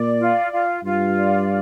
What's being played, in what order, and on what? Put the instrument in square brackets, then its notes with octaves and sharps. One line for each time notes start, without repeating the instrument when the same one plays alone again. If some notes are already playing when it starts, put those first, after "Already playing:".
Already playing: [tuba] A#2 [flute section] D5
[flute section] F4
F4
[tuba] G2 [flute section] F4
[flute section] D5